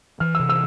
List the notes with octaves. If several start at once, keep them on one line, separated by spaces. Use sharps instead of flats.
E3 F6
E6
C3
E6